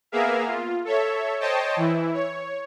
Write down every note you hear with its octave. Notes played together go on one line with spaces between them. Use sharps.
A#3 B3 G#4 A#4 E5 F5
F4
A4 C#5 E5
C5 C#5 D#5 G5 A5
E3 E4
C#5